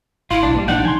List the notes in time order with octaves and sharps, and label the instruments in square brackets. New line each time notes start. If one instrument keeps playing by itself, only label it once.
[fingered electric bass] G#1 [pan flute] E4 [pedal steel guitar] F4
[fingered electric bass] B1 [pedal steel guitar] D4
[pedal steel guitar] F3 G3 [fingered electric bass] A#3
[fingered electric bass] A#1 F3 G#3 [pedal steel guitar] D4 F#5 G5 [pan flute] D#4
[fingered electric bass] C3 E3 [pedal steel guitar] G#5 C6